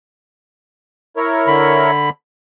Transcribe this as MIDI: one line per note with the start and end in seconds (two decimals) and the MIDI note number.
1.17 1.91 64
1.17 1.91 70
1.17 1.91 73
1.47 2.10 50
1.47 2.10 83